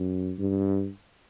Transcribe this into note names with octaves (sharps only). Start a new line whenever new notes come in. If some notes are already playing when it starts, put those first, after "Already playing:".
Already playing: F#2
G2